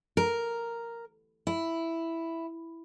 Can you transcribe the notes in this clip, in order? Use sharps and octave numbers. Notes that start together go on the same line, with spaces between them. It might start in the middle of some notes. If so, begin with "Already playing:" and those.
A#4
E4